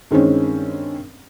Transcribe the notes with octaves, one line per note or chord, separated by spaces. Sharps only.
G2 D#3 G#3 C4 C#4